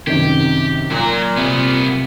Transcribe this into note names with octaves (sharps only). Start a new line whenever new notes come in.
F#2 C3 D#3 G4
A#2 F#3 A#5
C2 C3 B3